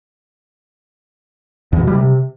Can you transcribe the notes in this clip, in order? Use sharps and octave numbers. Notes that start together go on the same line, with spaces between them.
E2
B2
G3
C3